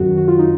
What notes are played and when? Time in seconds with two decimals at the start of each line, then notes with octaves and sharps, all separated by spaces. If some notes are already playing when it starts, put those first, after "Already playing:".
Already playing: F#2 D#3 F#3 F#4
0.17 F#4
0.28 F4
0.39 D#4